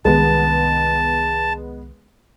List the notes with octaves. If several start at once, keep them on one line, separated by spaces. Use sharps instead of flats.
C2 D#3 G#3 B3 A5